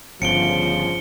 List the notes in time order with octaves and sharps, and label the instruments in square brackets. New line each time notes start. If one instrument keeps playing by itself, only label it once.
[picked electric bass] G1 [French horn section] C#3 F3 [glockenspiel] C#7 D7 G7